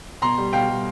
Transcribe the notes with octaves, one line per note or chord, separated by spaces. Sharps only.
B2 A#5 C6
G3
B2 F5 G5
G3